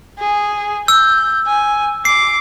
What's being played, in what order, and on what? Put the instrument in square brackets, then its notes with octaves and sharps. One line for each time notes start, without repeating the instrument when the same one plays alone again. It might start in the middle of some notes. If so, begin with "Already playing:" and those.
[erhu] G#4
[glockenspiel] E6 [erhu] G6
[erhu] G#5
[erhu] D6 [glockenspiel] C7